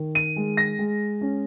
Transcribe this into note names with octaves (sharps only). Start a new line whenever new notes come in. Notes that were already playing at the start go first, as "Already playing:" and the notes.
Already playing: D#3
D#7
G#3
A#6
G#3
C#4